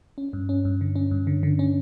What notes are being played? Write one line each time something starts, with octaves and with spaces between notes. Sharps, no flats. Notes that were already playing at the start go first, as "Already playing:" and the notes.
C#4
G2
C#4
G2
D3
C#4
G2
D3
D3
C#4